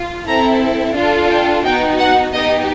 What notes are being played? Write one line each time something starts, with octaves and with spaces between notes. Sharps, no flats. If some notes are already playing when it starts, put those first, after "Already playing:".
Already playing: F4
C4 E4 A4 A#5
D4 F4 A4
G5
B3 D#4 F#4 G5
F#5
B3 D#4 G4 D#5